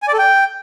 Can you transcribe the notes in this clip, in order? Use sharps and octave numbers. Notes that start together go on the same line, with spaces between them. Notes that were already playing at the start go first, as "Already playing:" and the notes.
G#5
D5
A4
G5